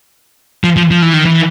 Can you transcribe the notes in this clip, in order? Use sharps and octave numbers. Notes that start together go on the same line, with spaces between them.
F3
F3
F3
E3
D#3
E3